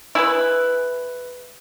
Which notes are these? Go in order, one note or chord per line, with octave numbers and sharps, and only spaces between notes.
E4 G#4 B4